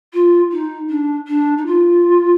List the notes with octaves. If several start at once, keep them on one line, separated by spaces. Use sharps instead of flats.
F4
D#4
D4
D4
D#4
F4